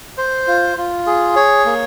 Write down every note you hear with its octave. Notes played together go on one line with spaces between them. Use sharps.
C5
F4
F4
G#4
C#5
A#3